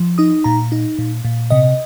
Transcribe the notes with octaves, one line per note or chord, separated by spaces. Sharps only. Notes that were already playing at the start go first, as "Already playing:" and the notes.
Already playing: F3
D#4 D#6
A#2 A#5
D#4
A#2
A#2
C3 D#5